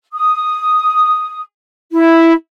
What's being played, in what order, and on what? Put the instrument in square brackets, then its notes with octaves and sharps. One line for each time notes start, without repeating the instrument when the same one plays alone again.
[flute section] D#6
E4